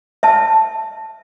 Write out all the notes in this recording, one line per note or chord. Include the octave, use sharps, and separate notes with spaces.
E5 A5